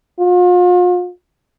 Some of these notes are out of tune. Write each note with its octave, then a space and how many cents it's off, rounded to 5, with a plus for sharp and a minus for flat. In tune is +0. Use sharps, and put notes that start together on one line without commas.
F4 +40